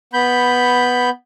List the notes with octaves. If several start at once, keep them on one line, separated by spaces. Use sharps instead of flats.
B3 B5 G6